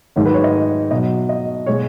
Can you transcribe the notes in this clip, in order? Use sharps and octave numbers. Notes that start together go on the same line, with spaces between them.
G#2 D#3 F#3 C#5
B4
C#5
D#5
B2 F#3 D#5
D#5
B2 G#3 C#5